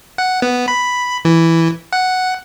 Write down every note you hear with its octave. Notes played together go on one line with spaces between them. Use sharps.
F#5
B3
B5
E3
F#5